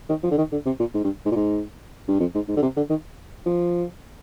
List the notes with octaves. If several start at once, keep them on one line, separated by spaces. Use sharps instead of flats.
D#3
F3
D3
D#3
D3
C3
A#2
G#2
G2
G#2
A#2
G#2
G2
F2
G#2
G#2
D3
C3
D3
D#3
F3